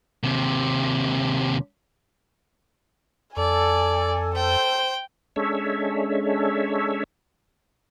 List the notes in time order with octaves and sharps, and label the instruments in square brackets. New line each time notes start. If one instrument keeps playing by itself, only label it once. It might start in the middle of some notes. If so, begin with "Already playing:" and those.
[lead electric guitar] D#2 C3
[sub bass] F2 [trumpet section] A4 [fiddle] D5 [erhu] G#5
[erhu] C5 [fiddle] G5
[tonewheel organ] G#3 C#4 D4 A4 C#5 E5